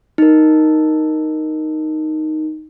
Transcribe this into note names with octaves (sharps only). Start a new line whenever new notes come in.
D#4 A#4